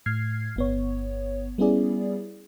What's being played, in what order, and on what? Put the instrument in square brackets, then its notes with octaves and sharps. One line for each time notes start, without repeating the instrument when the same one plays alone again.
[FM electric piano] A2 F6 G#6 C7
G1 B3 C#5
G3 B3 C#4 E4 G#4 D5